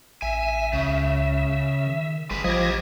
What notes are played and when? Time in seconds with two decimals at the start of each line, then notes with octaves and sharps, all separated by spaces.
0.22 A1 E5 G#5
0.73 C#2 C#3
1.87 D#3
2.30 G1 G#3 B4
2.44 A1 F3 G4 D#5 G#6 A#6